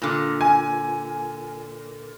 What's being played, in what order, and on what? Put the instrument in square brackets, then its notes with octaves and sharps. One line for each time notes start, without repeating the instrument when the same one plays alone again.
[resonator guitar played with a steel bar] A#2 D3
[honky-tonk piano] G#5